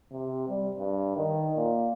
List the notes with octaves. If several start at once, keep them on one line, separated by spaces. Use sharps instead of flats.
C3
G3
G2
D#3
A#2